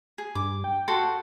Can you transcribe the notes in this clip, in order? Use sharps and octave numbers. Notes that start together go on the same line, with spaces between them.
G#4
G2 D6
G5
F#4 A4 C6